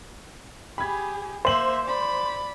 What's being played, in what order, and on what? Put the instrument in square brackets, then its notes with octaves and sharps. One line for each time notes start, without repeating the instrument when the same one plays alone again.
[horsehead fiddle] G4 G#4 [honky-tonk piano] B5 G#6
[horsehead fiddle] A#3 E5 [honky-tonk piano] C5 F#7
[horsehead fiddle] D5 B5